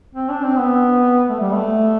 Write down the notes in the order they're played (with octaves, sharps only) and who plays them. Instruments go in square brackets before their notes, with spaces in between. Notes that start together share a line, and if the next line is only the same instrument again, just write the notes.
[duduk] C4
D4
C4
B3
A3
G3
A3